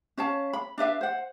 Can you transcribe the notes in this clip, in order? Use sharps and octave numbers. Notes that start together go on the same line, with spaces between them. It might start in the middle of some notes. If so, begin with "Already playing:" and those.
C#4 C#5 F5 A5
B5
D4 B4 E5 F5
C5 F#5